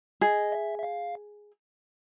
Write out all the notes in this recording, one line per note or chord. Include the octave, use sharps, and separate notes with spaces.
G#4 D#5
E5
E5
F5